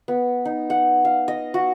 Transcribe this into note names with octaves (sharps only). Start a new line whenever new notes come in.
B3
D#4
F#5
F5
D#5
F#4